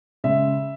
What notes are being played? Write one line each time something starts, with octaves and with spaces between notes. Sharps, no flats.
C#3 G#3 E5